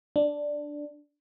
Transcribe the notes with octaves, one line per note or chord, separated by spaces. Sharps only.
D4